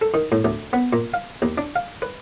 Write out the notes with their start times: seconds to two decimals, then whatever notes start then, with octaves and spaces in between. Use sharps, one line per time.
0.02 A4
0.14 D#3
0.32 A2
0.45 D2
0.73 B3
0.93 A#2
1.14 F5
1.42 D#2
1.58 D4
1.76 F5
2.02 B4